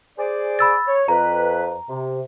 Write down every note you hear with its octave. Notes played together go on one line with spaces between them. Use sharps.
G#4 C5 D5
B5 E6 A6
C#5
F2 B4 A#5
C3